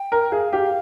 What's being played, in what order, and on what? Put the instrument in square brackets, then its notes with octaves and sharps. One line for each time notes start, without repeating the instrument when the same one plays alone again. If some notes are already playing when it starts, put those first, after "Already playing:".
Already playing: [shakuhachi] G5
[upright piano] A#4
[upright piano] G#4 [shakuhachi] F5
[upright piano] G4